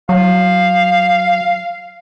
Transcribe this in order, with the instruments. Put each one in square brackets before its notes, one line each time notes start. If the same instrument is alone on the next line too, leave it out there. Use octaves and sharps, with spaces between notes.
[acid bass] F#3 [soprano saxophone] F5